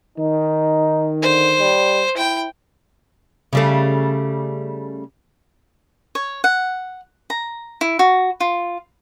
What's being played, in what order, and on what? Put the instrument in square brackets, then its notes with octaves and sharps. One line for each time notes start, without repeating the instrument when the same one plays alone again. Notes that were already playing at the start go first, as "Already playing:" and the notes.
[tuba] D#3 [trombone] D#4
[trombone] D3 [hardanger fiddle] C5
[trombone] G3
[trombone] E4 [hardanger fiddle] G5
[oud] C#3 G3 A3
[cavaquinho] C#5
F#5
A#5
E4
F#4
F4